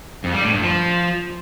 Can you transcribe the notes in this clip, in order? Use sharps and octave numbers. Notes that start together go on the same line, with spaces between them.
F2
G3
A2
G2
F3